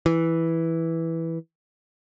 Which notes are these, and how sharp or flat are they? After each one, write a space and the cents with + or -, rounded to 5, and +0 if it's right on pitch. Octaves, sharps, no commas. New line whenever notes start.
E3 -5